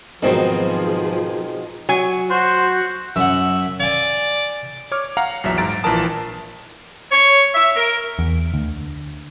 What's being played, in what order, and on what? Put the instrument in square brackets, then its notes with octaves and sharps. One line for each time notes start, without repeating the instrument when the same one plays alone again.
[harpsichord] G#2 D#3 F#3 [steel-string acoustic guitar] B2 C4 D#4 [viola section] F3 G#4
[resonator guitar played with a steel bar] F#3 G#5
[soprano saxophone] F#4 [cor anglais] C5
[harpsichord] F#2 F#5 [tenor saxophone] E5
[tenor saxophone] D5 [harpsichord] F5 G#5
[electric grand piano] C#5 D6 F6
F5 F#5 A#5 F6
A#1 E2 F#3 E5
G#2 A#5 A6 D7
A#1 E3 F4 A#4 A5 D#6
[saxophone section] C#5
E5
A#4
[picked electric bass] E2
D2